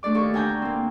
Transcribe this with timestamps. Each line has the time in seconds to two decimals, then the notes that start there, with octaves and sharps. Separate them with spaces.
0.03 A3 D4 D5 D6
0.15 D#2 A4 C#6 D6
0.34 D2 D4 G5 G#5 A#5 G6
0.62 A#3 C4